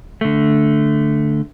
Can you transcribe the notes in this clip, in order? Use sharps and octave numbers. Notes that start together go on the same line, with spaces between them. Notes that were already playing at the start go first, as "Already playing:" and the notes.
D3 A3